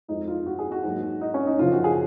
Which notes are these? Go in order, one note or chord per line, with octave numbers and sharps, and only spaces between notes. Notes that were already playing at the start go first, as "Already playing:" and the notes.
F2 F3 G#3 D#4
F4
F#4
G#4
F#4
G#2 F#3 A#3
D#4
C#4
D#4
F#2 C#3 F3 F4
F#4
G#4